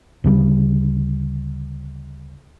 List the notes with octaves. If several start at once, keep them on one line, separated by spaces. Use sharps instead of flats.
D2 C#3 G3